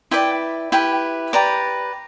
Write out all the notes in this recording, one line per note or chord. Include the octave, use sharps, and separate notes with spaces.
E4 B4 D5 G5
E4 G4 B4 G5
G4 B4 D5 A#5